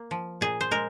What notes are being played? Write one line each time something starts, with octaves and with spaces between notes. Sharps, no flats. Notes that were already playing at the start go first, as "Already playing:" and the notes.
Already playing: A#3
F3
A#2 G#4
C5
G#3 A#4